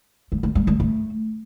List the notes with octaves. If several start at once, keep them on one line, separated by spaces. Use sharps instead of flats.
G#3
A3
G#3
G#3
A3